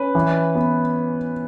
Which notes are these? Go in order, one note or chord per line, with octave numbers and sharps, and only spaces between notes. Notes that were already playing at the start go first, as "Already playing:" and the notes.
Already playing: C#4 B4
E3
B3